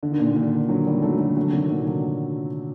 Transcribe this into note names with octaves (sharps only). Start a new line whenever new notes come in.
D3
D#3
A#2 D3
A#2 D3
D3 F#3
D#3 G3
F#3 A3
D3 F#3
D3 F#3
C3 D#3
A#2 D3
D3 F#3